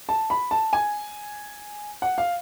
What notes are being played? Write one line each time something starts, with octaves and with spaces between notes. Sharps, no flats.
A5
B5
A5
G#5
F#5
F5